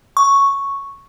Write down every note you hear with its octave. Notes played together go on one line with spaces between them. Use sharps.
C#6